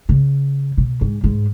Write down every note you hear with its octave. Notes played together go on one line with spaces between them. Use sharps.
C#3
B2
G#2
G#2